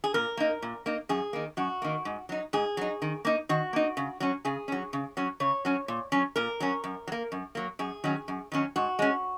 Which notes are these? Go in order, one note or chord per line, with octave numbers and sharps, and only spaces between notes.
G#4
A#2 A#4
A#3 D#4
A#2
A#3 D#4
F#2 G#4
D#3 A#3
F#2 F#4
D#3 A#3
G#2
F#3 D#4
G#2 G#4
F#3 D#4
D#3
A#3 D#4
D#3 F#4
A#3 D#4
C#3
F#3 C#4
C#3 G#4
F#3 C#4
C#3
F#3 C#4
C#3 C#5
F#3 C#4
A#2
F#3 C#4
A#2 A#4
F#3 C#4
F#2
F#3
A#3
F#2
F#3 A#3
F#2 G#4
D#3 F#3 C#4
F#2
D#3 F#3 C#4
G#2 F#4
G#3 C#4